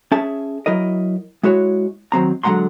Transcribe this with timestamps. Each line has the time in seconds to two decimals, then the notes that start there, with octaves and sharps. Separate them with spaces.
0.12 C#4 G#4 E5 A5
0.66 F#3 E4 A#4 D#5
1.43 G#3 E4 F#4 C#5
2.12 D#3 F#3 C4 A#5
2.43 D3 F#3 G#3 F#5 A#5 C6